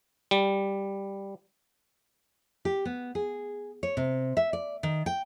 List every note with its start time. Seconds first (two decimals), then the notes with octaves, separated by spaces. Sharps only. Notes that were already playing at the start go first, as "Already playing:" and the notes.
0.31 G3
2.65 G4
2.85 B3
3.15 G#4
3.83 C#5
3.97 C3
4.37 E5
4.53 D5
4.83 D#3
5.06 G5